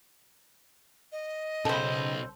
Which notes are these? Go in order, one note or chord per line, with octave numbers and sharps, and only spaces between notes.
D#5
B1 C#3 A4 C5 G5 B5